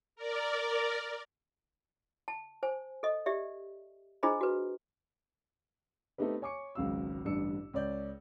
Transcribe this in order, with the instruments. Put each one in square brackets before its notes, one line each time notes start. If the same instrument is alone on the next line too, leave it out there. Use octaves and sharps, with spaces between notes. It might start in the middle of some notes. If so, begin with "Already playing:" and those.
[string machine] A#4 D5
[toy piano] A5
C5 G#5
A4 D#5
G4 D5 E5
D4 F4 G#4 C5 D#5 A#5
F#4 B4
[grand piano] A3 B3 C4 D#4 G4 B4
C#5 G#5 C#6 D6 C#7
G#1 C#2 C#3 F#3 F5 E6
A1 G2 D3 D4 E6 C#7
C#2 C#5 D5 G6